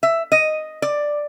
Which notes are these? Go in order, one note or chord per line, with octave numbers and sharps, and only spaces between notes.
E5
D#5
D5